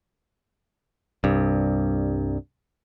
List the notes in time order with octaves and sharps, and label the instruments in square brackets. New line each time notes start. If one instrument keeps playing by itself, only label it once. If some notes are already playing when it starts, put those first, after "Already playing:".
[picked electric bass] C2 G2